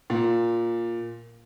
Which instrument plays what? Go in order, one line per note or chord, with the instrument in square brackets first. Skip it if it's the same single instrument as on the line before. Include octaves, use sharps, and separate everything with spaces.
[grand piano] A#2